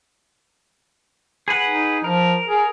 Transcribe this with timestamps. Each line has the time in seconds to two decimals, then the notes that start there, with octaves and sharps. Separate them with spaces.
1.48 G#4 B4 F#5
1.67 D#4
2.04 F3 A#4
2.48 G#4